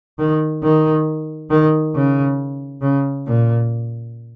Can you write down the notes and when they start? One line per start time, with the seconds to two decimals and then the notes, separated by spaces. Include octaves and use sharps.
0.19 D#3
0.63 D#3
1.50 D#3
1.94 C#3
2.82 C#3
3.26 A#2